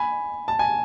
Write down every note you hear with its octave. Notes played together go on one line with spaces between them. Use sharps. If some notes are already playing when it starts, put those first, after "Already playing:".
Already playing: G#5 B5
A5
G#5